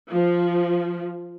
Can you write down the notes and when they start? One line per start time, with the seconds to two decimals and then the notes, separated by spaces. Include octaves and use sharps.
0.12 F3